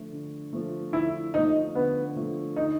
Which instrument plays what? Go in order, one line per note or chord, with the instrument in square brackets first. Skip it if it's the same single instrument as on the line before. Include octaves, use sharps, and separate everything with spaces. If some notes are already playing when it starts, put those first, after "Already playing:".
Already playing: [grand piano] D3 F3 A3
D3
F3 A3
[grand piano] D3 [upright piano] E4
[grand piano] F3 A3 [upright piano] D#4
[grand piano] D3 [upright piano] B3
[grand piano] F3 A3
[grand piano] D3 [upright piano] D#4